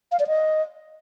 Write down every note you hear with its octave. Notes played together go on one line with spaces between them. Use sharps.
F5
D5
D#5